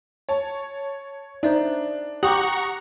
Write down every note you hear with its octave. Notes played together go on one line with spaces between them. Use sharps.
C#5 A5
D4 D#4 C5 D5 E5
G4 F#5 A#5 C#6 D#6 F#7